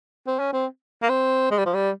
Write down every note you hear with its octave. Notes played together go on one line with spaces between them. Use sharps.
C4
C#4
C4
A#3
C4
G#3
G3
F3
G3